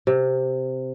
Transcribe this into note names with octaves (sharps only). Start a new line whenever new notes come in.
C3